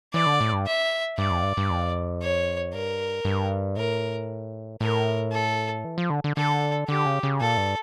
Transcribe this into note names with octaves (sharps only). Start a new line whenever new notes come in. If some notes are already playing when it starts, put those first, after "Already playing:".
E3 D5
D3
A2
G2
E5
G2 D5
F2
G2
G2
F2
C#5
G2 A#4
G2
A2 A#4
A2 A#4
A4
E3
F3
D3
D3
D3 A4
D3 G4
C#3
C#3
A#2 A4
G2